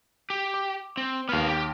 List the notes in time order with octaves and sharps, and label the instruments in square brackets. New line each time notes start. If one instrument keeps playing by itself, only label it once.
[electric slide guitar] G4
[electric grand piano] D6
[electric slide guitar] C4
[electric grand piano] D#2 F6 [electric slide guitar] B3 F5
[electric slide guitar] G4